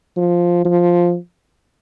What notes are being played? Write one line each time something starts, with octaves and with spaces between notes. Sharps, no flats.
F3
F3